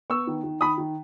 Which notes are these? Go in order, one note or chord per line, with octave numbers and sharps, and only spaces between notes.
B3 C#6 E6
D#3
D#3
D#3 B5 D#6
D#3